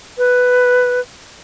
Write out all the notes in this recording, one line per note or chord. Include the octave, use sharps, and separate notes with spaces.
B4